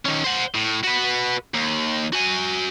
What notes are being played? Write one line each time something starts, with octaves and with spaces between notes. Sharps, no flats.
D#3 C#4
C5 F#5
A2
F#4 B4
D#2
F#4 G#5